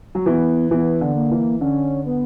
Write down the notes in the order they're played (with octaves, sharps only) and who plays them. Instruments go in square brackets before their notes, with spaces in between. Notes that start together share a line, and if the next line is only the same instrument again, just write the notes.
[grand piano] F#3
[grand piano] E3 [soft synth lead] B3
[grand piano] E3 [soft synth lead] B3
[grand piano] D3
[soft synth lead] A#3
[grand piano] E3
[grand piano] D3 [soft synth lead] C#4
[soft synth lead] B3